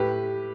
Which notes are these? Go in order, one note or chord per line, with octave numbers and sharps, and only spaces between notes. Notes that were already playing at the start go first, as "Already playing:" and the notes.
Already playing: A2 G4 B4